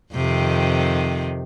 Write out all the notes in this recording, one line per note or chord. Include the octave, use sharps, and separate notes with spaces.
F2 C3 D#3